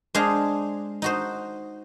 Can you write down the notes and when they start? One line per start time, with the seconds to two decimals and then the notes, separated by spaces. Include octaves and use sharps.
0.14 G#3 D4 G#4 C5 F5
1.02 D#4 F#4 C5